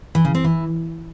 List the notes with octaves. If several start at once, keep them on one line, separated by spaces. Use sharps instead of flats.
E3
C#3
C4
E3